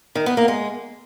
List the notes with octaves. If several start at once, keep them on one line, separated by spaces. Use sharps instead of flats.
D#3
B3
A#3
G#3